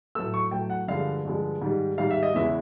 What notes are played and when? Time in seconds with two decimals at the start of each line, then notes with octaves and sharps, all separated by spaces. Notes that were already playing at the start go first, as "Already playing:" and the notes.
0.15 A2 F#3 A3 E6
0.34 C#6
0.51 A2 F#3 A3 G5
0.70 F#5
0.88 G2 D3 F3 G#3 F5
1.25 G2 D3 F3 G#3
1.62 G#2 D#3 G3
1.98 G#2 D#3 G3 F5
2.10 E5
2.23 D#5
2.34 E2 C#3 E3 G#3 E5